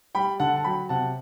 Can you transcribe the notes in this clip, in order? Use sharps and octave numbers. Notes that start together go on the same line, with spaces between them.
G3 G5 B5
D3 F#5 A5
A5
F#3 G5 B5
C3 F#5 A5